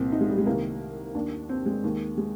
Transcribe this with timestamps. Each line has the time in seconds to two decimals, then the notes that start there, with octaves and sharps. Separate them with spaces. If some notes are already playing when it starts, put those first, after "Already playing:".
Already playing: C2 A#2 C4
0.12 D#4
0.21 G#3
0.30 G3
0.38 G#3
0.46 C2 C3 D#3 A#3
1.15 D#2 D#3 D4
1.49 C4
1.66 G#3
1.83 D#2 D#3
2.17 G#3